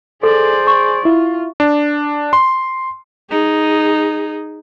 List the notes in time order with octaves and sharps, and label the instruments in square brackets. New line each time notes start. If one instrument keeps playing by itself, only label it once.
[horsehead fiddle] G#4 D5 [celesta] A4 [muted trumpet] C5
[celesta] C#6
[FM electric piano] E4 [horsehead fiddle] F4
[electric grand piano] D4
C6
[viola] D#4 G#4